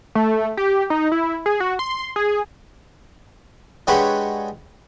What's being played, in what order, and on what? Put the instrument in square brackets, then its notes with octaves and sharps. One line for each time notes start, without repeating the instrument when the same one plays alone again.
[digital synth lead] A3
G4
D#4
E4
G#4
F#4
C6
G#4
[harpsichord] G#3 D4 G4 B4 C#5 F#5